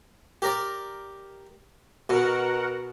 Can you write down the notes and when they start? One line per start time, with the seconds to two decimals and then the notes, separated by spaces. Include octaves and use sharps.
0.42 G4 A#4 D5
2.09 B2 F#4 A#4 F#5